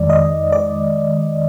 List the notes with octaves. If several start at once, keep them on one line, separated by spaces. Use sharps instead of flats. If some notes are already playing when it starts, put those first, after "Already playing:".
Already playing: F2 D#3 G#3 D5
D#5
D5